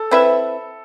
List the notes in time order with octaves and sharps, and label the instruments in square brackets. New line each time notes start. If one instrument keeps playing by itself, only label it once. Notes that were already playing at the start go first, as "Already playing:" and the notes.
Already playing: [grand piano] A4
[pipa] C4 E4 B4 E5